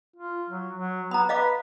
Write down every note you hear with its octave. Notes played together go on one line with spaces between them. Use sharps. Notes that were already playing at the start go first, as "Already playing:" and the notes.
F4
F#3
F#3
B3 A#5 B5
B4 D#5 F5 D6